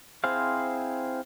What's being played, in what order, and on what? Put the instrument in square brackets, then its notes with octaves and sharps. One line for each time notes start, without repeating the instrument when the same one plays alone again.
[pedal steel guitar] C4 E4 G#4 C5 F5